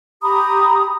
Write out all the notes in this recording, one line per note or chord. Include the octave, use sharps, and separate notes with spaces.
G4 A#5 B5 D#6